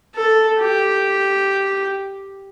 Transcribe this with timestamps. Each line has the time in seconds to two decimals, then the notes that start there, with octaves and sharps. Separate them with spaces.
0.15 A4
0.60 G4